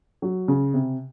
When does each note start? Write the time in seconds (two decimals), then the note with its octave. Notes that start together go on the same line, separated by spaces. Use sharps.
0.22 F#3
0.48 C#3
0.74 C3